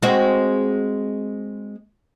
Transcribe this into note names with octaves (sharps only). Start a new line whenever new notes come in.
G#3 C4 F#4